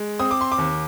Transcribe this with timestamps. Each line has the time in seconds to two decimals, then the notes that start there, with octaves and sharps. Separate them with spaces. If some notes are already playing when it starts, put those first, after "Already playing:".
Already playing: G#3
0.19 C4 D#6
0.31 D6
0.41 C6
0.52 D6
0.58 D#2